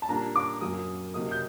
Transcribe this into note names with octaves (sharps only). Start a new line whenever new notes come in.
A5
A#2 G3 A#3 D4 A#5
D6
F#2 F#3 A#3 D#6
C3 F#3 A#3 D#4 D#6
G6